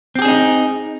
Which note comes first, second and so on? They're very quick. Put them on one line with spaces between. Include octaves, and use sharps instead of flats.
C4 G4 G#4 D4 D#4